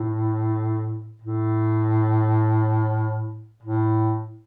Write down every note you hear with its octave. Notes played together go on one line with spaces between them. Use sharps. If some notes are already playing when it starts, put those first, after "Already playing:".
Already playing: A2
A2
A2